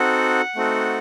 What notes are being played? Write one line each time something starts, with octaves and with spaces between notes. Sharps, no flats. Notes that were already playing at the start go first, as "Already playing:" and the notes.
Already playing: C4 D#4 F#4 A4 F#5
A3 C4 D#4 F#4 A4